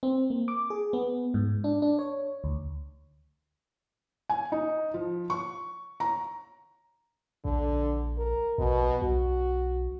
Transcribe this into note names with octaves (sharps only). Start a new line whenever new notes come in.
C4
A#3
D6
G#4
B3
G#2
D4
D4
C#5
D2
G#5
D#4
F3
C#6
A#5
A#1 D3
A#4
A#1 B2
B1 F#4